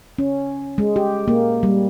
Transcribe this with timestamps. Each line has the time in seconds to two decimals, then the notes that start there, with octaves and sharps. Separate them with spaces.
0.19 C#4
0.78 G#3
0.96 G4
1.28 A#3
1.63 G3